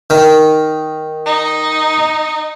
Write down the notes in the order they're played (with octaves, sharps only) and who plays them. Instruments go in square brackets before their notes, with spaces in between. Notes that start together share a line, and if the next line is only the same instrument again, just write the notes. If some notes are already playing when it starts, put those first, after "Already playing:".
[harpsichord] D#3
[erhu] D#4